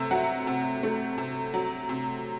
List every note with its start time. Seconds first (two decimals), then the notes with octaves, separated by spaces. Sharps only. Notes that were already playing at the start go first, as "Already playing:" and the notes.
Already playing: C3 A3 E5
0.11 F#3 F#5
0.47 C3
0.83 A3
1.18 C3
1.54 F#3
1.89 C3